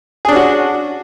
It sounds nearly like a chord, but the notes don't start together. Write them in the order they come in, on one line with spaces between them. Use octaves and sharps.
G#4 D4 C#4 F#4